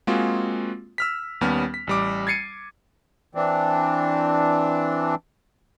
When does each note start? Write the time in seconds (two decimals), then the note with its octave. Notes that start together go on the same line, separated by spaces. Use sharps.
0.07 G#3 A#3 C4 F4 F#4 G#4
0.98 E6 F6 B6
1.41 D#2 G3 B3 C#4 F6
1.74 B6
1.87 A1 G3 D6
2.27 G#6 A6 C7 C#7 D#7
3.35 E3 C4 D4